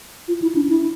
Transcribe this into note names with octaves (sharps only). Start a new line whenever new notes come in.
F4
E4
D4
E4